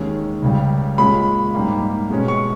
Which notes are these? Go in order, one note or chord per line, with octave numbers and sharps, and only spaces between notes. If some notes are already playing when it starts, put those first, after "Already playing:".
Already playing: D#2 D#3 G#3 C#4
C#2 C#3 G3
A#2 G#3 C#4 B5
G#2 G3 A#3
B2 G#3 C#4
C#6